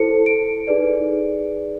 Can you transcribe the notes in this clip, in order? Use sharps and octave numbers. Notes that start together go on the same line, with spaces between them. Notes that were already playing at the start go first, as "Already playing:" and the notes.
Already playing: E4 A4 C5 C#7
D7
D#4 G#4 B4 D5